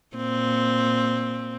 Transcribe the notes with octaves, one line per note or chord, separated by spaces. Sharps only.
A#2 C4